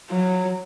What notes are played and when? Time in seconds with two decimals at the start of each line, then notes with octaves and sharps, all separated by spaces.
0.10 F#3